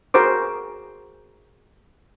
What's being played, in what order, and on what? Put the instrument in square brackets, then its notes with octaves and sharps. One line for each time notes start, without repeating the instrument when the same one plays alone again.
[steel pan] F#4 G#4 A#4 C5 D6